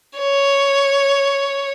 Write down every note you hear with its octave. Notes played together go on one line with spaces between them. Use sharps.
C#5